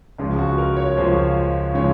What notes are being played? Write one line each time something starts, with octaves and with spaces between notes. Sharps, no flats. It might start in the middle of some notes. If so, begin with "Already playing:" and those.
C#2 C#3 F3 G#3 F4
F#4
A#4
C#5
C#2 C#3 F3 G#3 C5
C#3 F3 G#3 C#5